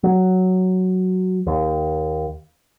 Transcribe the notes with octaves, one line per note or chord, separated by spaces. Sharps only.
F#3
D#2